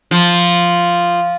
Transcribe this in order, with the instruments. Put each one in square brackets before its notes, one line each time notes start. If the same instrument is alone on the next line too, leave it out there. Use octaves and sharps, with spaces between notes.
[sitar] F3